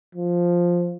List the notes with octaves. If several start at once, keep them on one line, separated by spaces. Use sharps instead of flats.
F3